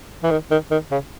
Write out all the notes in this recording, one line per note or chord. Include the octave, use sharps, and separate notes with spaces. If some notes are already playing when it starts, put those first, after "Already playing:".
E3
D#3
D#3
D#3
C#3